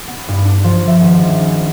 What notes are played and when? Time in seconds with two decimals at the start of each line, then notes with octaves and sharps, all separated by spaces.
0.07 B3
0.28 G2
0.45 D4
0.64 F3
0.88 E5
1.00 G#1
1.28 C#4